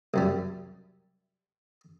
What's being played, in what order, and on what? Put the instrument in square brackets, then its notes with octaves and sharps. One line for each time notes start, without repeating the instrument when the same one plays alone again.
[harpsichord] C2 F#2 G3